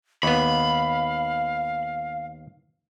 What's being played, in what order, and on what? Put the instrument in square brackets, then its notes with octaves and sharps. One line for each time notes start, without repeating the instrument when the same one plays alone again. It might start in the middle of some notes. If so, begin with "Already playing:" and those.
[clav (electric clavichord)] D#2 B3 [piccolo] F5 [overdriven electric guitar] B5